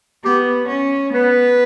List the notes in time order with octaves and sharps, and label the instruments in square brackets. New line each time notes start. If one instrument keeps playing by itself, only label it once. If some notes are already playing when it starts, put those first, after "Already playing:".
[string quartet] B3 [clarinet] G4
[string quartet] C#4
[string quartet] B3 [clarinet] B4